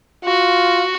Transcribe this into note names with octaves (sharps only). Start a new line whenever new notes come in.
F4 F#4